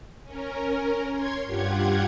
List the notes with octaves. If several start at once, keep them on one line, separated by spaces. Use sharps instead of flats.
C#4 A#4
C#5 C6 G#6
G2 F4 G4 F#5 G#6